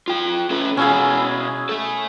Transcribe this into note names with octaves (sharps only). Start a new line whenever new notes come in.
F4 G5
C#4 A4 B4
B2 C#4 E4 F#4 G#4 F5
A3 A4